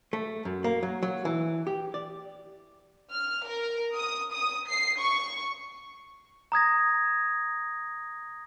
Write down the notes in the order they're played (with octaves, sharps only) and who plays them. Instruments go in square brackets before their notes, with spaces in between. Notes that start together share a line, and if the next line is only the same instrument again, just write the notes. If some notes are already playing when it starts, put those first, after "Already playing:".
[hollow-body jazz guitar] A3
F#2
A#3
F#3
F#3
E3
G4
D5
[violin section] F6
A#4
D#6
D#6
C7
C#6
[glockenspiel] A#5 D#6 G#6 A#6